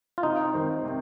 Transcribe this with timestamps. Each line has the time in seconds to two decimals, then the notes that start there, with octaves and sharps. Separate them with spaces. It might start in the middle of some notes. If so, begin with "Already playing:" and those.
0.18 F4
0.23 C3 D#4
0.54 D#3 C4
0.85 C3